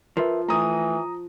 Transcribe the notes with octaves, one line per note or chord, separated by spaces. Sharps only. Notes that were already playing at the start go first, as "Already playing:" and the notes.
F3 A#4 B4 E5
E3 A3 A#5 D#6